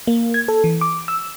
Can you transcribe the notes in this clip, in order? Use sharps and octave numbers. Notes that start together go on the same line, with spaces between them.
A#3
G#6
A4
E3
D6
E6